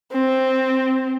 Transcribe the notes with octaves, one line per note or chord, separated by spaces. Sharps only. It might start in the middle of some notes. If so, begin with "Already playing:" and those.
C4